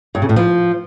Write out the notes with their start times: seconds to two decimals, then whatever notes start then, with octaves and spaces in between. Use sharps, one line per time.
0.15 G2
0.22 C#3
0.29 A2
0.36 F3